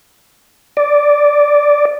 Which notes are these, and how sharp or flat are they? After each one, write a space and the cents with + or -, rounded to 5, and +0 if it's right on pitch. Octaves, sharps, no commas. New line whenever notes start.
D5 -5